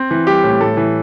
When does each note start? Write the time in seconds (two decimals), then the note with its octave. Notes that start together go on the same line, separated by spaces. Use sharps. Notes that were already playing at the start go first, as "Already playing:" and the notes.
Already playing: C4
0.11 E3
0.27 G3 G4
0.44 A2
0.60 A2 A4
0.77 E3